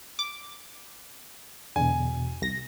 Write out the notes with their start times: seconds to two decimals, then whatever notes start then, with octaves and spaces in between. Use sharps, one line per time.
0.19 D6
1.76 E2 B2 D3 G#5
2.42 C2 A#6